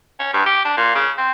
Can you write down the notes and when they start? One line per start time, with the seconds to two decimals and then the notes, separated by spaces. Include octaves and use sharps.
0.20 C#4
0.33 G2
0.46 G4
0.65 D4
0.77 A#2
0.95 C#3
1.18 C4